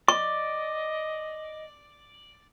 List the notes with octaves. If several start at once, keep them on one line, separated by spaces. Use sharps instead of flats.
D5 D#5 C#6